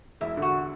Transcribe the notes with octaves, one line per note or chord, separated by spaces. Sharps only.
E1 E4
D3
F#4